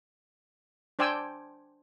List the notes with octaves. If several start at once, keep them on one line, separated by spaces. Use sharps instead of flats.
D4 C5 D5 G5 G#5 E6